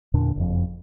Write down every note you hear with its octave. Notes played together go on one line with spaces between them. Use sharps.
E2 A#2 D3 D4
F#1 F2